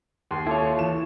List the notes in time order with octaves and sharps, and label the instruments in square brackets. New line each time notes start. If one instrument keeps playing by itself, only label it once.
[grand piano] D#2 [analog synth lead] C6
[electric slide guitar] E4 F4 C#5 [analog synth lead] A4
[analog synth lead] E3 [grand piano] E7